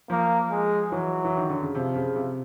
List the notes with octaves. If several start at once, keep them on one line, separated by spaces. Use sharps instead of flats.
F3 A#3
G#3
E3 F#3
E3
D#3
D3
C#3
C3 F3
C#3
C3